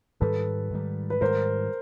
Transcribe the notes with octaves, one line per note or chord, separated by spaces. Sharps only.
G#2 D#3 G3 A4 B4
G#2 D#3 G3
B4
G#2 D#3 G3 A#4 C5